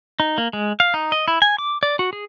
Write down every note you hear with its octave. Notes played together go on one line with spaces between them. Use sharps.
D#4
A#3
G#3
F5
D#4
D#5
E4
G#5
D6
D5
F#4
G#4